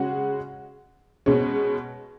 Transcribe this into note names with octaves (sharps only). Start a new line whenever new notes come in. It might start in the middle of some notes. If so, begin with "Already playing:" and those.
Already playing: C#3 G#3 C#4 F#4
B2 G#3 C#4